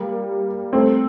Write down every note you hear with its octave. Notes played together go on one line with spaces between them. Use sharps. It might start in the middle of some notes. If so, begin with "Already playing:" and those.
Already playing: G3 A#3
A3 C4